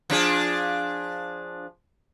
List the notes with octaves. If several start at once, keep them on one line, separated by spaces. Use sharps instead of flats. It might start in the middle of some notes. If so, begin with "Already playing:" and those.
F3 D4 G#4